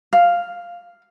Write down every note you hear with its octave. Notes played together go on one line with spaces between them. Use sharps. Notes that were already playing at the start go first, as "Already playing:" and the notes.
F5